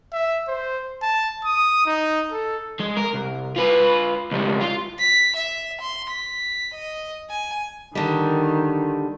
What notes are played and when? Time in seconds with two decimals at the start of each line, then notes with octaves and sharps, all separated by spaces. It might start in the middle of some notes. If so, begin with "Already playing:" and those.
0.12 E5
0.48 C5
1.02 A5
1.44 D#6
1.86 D#4
2.32 A4
2.79 G#3
2.97 A#4
3.13 C2
3.56 F4 B4
4.31 C#2 G3
4.61 F4
4.99 B6
5.36 E5
5.81 C6
6.10 B6
6.74 D#5
7.30 G#5
7.95 D3 D#3 G3